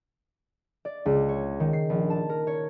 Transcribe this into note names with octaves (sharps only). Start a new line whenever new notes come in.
D5
C#2
C#5
D#3
C7
A#1
A5
A#4
C#5